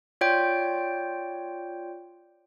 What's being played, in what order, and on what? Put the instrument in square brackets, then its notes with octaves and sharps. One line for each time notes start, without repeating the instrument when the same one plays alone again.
[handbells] F4 C#5 D5 G5 G6